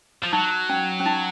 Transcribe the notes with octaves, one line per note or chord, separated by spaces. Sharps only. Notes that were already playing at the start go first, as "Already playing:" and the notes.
F3
F#3 D#4
C#4
C#4
D#4